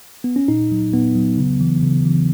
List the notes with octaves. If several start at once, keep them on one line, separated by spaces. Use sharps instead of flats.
B3
C#4
A#2 D#4
F#3
A#2 B3
F#3
C#3
E3
C#3
E3